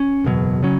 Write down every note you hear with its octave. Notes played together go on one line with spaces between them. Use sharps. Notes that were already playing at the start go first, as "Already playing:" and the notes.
Already playing: C#4
F#1 E2 B2 F#3
C#3 F#3 C#4